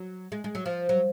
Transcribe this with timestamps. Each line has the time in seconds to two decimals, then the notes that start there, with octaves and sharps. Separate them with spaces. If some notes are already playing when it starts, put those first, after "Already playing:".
Already playing: F#3
0.32 G#3
0.44 G#3
0.55 F#3
0.66 F3
0.89 F#3